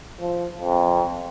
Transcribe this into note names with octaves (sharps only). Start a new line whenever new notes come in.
F3
F2